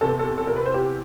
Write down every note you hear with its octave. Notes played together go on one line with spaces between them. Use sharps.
E2 C3 E3 A4
A4
A4
A#4
B4
C5
G4